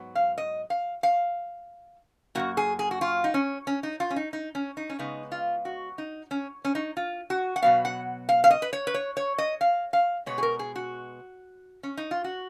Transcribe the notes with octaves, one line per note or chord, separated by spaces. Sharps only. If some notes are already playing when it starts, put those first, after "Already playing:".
Already playing: G#2 F#3 B3
F5
D#5
F5
F5
F#2 D#3 A#3 F#4
G#4
G#4
F#4
F4
D#4
C#4
C#4
D#4
F4
C#4
D#4
D#4
C#4
D#4
C#4
C#3 G#3 B3 D#4
F4
F#4
D#4
C#4
C#4
D#4
F4
F#4
F#5
B2 F#3 B3 F5
F#5
F5
F5
D#5
B4
C#5
B4
C#5
C#5
D#5
F5
F5
B2 G#3 B3 C#5
G#4
A#4
G#4
F#4
C#4
D#4
F4
F#4